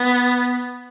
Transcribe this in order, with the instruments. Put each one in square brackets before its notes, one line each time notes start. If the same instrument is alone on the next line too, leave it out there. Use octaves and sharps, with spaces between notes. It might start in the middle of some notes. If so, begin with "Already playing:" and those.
Already playing: [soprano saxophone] B3